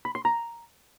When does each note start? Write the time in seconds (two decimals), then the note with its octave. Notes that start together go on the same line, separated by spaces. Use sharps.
0.05 B5
0.15 C6
0.25 A#5